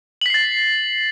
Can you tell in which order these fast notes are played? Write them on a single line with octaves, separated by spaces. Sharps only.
F#7 B6 C7 A6